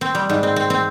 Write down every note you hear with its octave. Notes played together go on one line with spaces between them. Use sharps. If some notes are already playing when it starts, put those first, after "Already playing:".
C4
G3
G#2
C4
C4
C4